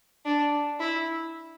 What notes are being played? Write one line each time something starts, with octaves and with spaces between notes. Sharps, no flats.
D4
E4